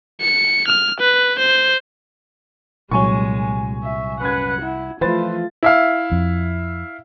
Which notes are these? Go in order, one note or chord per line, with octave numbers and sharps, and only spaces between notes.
C#7
F6
B4
C5
C2 A#2 F#3 G#3 C#5 G#5 C#6
E5
F#2 B4 F#5 G#6
E4 F#5
E3 F3 A3 F4 B4 C5 A6
E4 E5 F5
F2